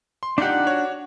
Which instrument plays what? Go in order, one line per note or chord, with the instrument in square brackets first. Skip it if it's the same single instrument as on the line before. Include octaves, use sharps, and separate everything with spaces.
[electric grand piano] C6
[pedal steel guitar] D4 F#5 [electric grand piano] D#4 F4 G4
[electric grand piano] F#4 C#5